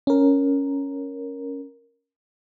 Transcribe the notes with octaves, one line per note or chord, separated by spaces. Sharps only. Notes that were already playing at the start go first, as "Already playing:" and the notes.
C#4 A#4